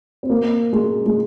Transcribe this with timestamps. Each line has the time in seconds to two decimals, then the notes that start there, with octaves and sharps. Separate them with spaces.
0.23 C4
0.30 A#3
0.73 G#3
1.06 G#3